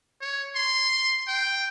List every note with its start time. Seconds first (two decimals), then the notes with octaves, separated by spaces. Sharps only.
0.21 C#5
0.55 C6
1.27 G5